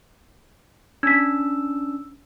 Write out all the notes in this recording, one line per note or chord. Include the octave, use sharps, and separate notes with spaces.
C#4 D4 E6 G#6 B6